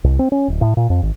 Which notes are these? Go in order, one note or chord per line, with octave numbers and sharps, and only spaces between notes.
C2
C4
C#4
D1
A2
A#2
F2
G#1